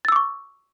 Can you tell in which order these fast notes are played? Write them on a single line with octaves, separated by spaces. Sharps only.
A6 E6 D6 C#6